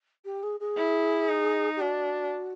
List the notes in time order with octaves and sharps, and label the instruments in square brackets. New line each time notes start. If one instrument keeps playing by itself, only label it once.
[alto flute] G4
G#4
G#4
[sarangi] E4
D#4
[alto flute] G4
[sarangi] D4 [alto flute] F#4